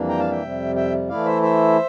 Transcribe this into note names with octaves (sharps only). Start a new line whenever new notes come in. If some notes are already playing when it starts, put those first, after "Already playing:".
Already playing: F2 E3 G3 A#3 D4
G5 A#5
F5 A5
E5 G5
F2 C3 G3
E5 G5
E3 A3 E4 D5 F5
C5 E5
C5 E5